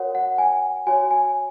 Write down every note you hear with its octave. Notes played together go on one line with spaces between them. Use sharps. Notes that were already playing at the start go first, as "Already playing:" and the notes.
Already playing: F#4 A#4 C#5 F#5
F#5
G#5
F#4 C#5 G#5
G#5